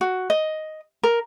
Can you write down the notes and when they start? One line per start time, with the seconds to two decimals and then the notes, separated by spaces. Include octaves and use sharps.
0.01 F#4
0.30 D#5
1.03 A#4